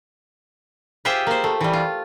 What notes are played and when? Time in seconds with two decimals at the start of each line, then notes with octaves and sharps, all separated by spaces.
1.05 F4 G4 G#4 C5 E5 G5
1.27 A#3 C5
1.44 A3
1.61 E3 G3
1.73 F4